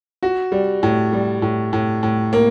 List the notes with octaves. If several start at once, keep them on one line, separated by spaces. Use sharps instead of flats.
F#4
G3
A2
G3
A2
A2
A2
A#3